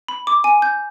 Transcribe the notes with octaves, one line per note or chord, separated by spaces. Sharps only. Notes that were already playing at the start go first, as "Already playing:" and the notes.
B5
D6
G#5
G6